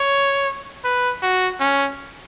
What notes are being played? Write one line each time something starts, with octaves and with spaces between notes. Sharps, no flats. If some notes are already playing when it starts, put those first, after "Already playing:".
Already playing: C#5
B4
F#4
C#4